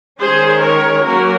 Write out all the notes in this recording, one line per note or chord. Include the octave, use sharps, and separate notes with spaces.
D#3 G#3 C#4 G#4 C5
A#4 C#5
F#3 A#3 C#4 F#4 A#4